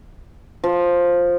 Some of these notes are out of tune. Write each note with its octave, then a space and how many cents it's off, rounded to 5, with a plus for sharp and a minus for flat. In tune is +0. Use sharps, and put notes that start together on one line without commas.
F3 +5